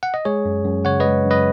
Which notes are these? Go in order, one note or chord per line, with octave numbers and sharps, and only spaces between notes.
F#5
D#5
G#3 G#4 C#5
F#2
F#2
C#3 C#5 F#5
B4 D#5
G#3
F#2
B4 D#5